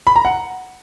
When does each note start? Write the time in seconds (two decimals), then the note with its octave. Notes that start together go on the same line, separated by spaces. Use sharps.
0.07 B5
0.16 A#5
0.25 F#5